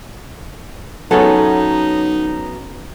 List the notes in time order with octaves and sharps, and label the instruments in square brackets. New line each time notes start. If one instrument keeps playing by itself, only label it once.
[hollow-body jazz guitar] F#3 A3 B3 [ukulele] C#4 G#4 A4 [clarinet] D#4